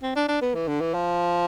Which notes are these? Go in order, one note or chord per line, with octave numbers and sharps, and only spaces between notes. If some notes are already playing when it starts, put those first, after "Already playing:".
C4
D4
D4
B3
E3
D3
E3
F3